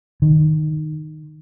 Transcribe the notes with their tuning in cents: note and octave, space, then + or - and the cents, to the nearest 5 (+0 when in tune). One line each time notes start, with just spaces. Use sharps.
D#3 -10